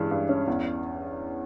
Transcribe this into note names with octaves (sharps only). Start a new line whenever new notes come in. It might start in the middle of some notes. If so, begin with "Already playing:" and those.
Already playing: G2 E3 G#3 C#4
G2
C#4
E2